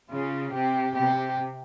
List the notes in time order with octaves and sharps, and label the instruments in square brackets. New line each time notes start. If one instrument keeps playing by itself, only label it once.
[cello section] C#3 [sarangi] F4
[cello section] C3 [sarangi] G4
[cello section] C3 [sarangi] G4